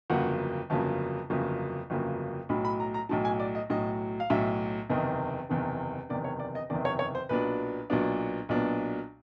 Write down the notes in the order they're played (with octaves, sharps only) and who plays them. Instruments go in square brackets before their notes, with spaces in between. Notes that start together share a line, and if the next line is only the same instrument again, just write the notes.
[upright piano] G1 F2 C#3 F#3 A#3 F#5
G1 F2 C#3 F#3 A#3 A5
G1 F2 C#3 F#3 A#3
G1 F2 C#3 F#3 A#3
B1 A2 F#3 B5
B5
A#5
A#5
B1 A2 F#3 A5
G#5
D5
D#5
B1 A2 F#3 D#5
F5
B1 A2 F#3 E5
F#1 E2 C3 D#3 D#5
F#1 E2 C3 D#3
F#1 E2 C3 D#3 D5
C#5
D5
D#5
F#1 E2 C3 D#3 D5
C#5
C#5
C5
B1 A#2 F#3 B3 D4 B4
B1 A#2 F#3 B3 D4
B1 A#2 F#3 B3 D4